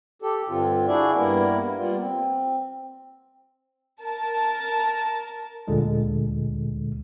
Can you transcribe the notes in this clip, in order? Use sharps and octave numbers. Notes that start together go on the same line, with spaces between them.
G4 A4
G2 D3 C4 F4
D4 E4 F#4 G#4 D5 E5
G2 G3 A#3 B3 E4 A#4
G3 A#3 B3 F4
C4
A#4 A5
D2 A#2 D3 G#3